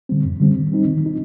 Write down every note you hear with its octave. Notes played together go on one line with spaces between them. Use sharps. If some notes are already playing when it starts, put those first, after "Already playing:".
D3 G3 C4
F2
D3 G3 C4
D#3
G3 C4 D#4
D#3
G3 C4 D#4